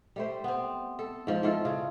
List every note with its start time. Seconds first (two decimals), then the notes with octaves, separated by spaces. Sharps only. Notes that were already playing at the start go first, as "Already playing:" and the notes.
0.16 G3 A3 C5
0.44 B3 C4
0.99 A4
1.27 G#2 F3
1.43 G#2 E3 F4 A4
1.65 C#3